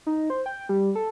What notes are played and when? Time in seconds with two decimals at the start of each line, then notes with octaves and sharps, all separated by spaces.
0.07 D#4
0.30 C5
0.46 G5
0.69 G3
0.95 A4